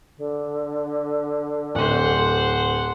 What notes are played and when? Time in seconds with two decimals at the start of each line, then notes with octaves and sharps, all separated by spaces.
0.17 D3
1.75 D1 C5 F#5